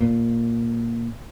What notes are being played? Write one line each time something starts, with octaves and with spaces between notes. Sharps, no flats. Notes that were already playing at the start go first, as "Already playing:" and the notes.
A#2